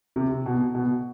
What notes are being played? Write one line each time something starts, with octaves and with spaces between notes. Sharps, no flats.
C3
B2
B2